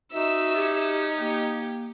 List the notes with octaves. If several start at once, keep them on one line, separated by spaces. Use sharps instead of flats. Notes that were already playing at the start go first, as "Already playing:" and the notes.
D#4 F#4 E5 E6
C#4 G4
A#3 G4